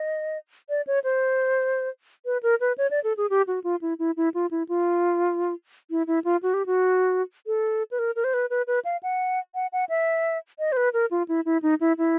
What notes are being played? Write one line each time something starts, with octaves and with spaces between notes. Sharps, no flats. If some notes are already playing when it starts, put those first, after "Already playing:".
Already playing: D#5
D5
C#5
C5
B4
A#4
B4
C#5
D5
A4
G#4
G4
F#4
F4
E4
E4
E4
F4
E4
F4
E4
E4
F4
F#4
G4
F#4
A4
B4
A#4
A#4
C5
B4
B4
B4
F5
F#5
F#5
F#5
E5
D#5
C5
B4
A#4
F4
E4
E4
D#4
E4
E4